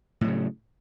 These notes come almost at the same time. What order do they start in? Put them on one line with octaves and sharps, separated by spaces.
A2 F#3 C#3